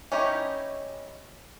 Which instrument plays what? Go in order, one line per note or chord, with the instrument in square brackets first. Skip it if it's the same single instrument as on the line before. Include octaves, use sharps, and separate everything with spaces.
[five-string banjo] C#4 D#4 E4 G4 C#5